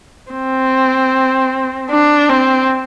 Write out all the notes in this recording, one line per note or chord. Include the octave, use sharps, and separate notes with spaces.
C4
D4
C4